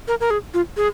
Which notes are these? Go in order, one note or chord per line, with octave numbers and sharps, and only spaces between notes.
A#4
A#4
G#4
F4
G#4